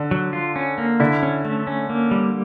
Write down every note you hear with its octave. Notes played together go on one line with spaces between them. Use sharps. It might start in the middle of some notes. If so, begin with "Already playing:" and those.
Already playing: D3
F#3
F4
C#4
A#3
D3 E4
C#4
A3
C#4
A#3
G3